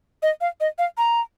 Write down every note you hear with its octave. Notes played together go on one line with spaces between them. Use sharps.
D#5
F5
D#5
F5
A#5